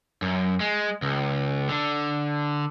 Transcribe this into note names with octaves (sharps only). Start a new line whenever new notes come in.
F#2
G#3
C#2
D3